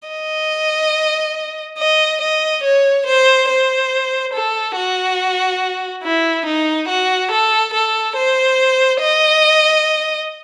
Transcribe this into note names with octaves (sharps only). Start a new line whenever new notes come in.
D#5
D#5
D#5
C#5
C5
C5
A4
F#4
E4
D#4
F#4
A4
A4
C5
D#5